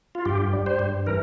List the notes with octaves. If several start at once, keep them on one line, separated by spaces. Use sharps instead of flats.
F4
G2 G4
G3
C5
G2
E3 A#4